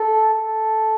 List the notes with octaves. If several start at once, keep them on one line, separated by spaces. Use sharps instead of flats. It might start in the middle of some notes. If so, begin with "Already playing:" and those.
Already playing: A4
A4